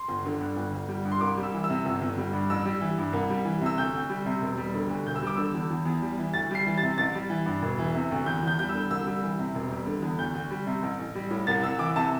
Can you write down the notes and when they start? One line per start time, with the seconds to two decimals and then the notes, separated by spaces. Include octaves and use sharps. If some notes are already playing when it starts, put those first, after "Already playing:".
Already playing: C6
0.08 G1
0.25 D3
0.41 G2
0.56 G1
0.74 G1
0.88 G3
1.05 G2
1.12 C6
1.21 C2 D6
1.37 G3
1.43 E6
1.54 E3
1.64 E6
1.70 C3
1.85 G1
2.01 G1
2.18 G3
2.33 G2
2.50 A1 E6
2.65 G3
2.81 E3
2.98 G2
3.13 C2
3.30 G3
3.45 E3
3.61 C3 E6
3.78 D2 G6
3.94 D2
4.09 G3
4.26 C3
4.41 E1
4.57 G3
4.74 D3
4.90 D2
5.05 E1 G6
5.16 E6
5.22 G3 D6
5.37 D3 E6
5.54 E2
5.70 E2
5.85 E2
6.02 G3
6.18 E3
6.34 D2 A6
6.51 G3 C7
6.67 E3
6.78 A6
6.83 C3
6.98 A1 A6
7.15 G3
7.30 E3
7.46 G2
7.62 E1
7.79 E3
7.95 C3
8.11 D2
8.26 E2 G6
8.43 E2 G6
8.59 G3 G6
8.69 E6
8.74 D3
8.90 C2 E6
9.07 G3
9.23 E3
9.39 C3
9.55 E1
9.71 G3
9.86 D3
10.02 E2
10.19 D2 G6
10.35 D2
10.51 G3
10.66 C3
10.82 A1
10.99 A1
11.15 G3
11.31 A2
11.47 C2 A6
11.63 C2 E6
11.79 E3 D6
11.96 C3 A5